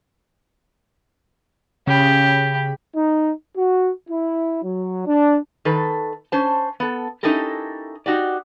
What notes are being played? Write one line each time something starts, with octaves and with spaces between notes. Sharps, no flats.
C#3 G4 B5
D#4
F#4
E4
F#3
D4
D#3 A4 B4
C#4 C5 A5
B3 A4
C#4 D#4 E4 G4 A4 A#4
D#4 F#4 G4 D5